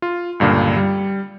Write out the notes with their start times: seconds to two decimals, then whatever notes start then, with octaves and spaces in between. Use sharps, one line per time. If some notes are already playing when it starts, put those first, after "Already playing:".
0.02 F4
0.40 C#2 G2 A#2 D3
0.77 G3